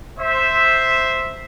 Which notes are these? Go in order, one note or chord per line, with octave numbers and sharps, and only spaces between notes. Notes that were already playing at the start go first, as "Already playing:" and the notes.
C5 E5